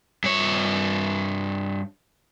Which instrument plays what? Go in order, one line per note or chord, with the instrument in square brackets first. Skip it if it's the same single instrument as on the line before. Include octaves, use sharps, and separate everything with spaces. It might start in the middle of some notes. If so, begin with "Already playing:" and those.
[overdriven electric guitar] G2 C#5